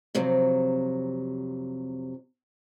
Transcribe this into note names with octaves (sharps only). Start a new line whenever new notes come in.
F2 C3 F#3